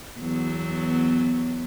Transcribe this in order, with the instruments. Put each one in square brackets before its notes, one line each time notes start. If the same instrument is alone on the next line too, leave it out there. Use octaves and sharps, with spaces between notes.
[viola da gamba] E2 F#3 B3